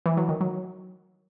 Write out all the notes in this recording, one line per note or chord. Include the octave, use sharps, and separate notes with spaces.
E3
F#3
D#3
F#3